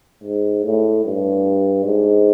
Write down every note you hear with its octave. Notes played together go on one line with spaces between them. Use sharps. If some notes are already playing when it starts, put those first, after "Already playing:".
G#2
A2
G2
G#2